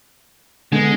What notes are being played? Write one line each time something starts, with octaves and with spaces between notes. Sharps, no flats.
D3 G#3 B3